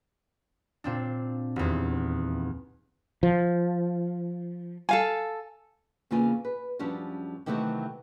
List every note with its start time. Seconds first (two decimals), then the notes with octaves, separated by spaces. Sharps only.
0.84 A#2 C4 D4
1.56 D#1 E2
3.23 F3
4.89 A4 F5 G#5
6.11 E2 C#3 A#3 C4 F4 G#5
6.45 B4
6.79 F#2 F3 G3 C#4 D4
7.46 C3 D#3 E3 F#3 A3 C4